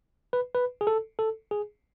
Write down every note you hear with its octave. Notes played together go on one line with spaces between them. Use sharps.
B4
B4
G#4
A4
A4
G#4